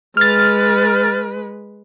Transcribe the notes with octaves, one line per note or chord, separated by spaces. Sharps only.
G#3 B4 F6 A6